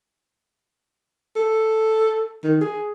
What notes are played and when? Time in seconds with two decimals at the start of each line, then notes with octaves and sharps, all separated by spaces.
1.36 A4
2.44 D#3
2.61 G#4